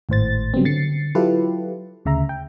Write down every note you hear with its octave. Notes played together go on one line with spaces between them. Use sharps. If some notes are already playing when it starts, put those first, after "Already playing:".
G#1 A2 C5 A6
C#3 F#3 G3 B3 C4
D3 A6 C7 C#7
F#3 E4 F4 G4 A4 B4
D2 C#3 E5 A#5
G5